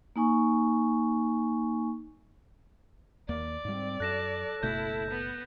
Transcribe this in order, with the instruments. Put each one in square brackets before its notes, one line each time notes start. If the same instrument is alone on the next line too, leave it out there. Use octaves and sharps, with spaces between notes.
[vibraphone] A#3 D#4 G#5 C#6
[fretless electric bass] D#2 A#3 [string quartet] D5
[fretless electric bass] G#2 G3 [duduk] C4
[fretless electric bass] F#2 [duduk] A4 [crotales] F#6 A#6 E7
[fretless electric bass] F#1 B2 A3 [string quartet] E4 [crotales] G6
[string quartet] B3